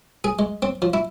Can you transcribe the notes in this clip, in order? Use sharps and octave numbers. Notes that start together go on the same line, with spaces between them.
G#4
G#3
C4
F3
E4